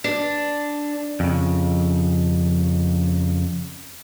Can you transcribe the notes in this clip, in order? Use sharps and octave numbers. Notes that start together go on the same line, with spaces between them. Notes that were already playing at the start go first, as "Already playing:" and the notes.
D4
F2 C#3